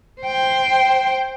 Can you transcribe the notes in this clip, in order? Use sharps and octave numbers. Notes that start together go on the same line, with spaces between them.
C5 G5